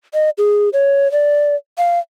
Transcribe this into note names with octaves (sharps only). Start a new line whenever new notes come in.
D#5
G#4
C#5
D5
F5